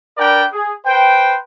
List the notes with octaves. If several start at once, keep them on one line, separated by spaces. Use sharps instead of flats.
D4 A#4 B4 D5 G5
G#4
B4 C5 G5